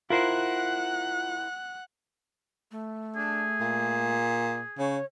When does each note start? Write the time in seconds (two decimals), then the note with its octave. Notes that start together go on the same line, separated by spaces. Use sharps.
0.10 E4 F4 A#4 C5 F#5 F#6
2.71 A3
3.16 D4 G#4
3.60 A#2
4.78 C#3 C#5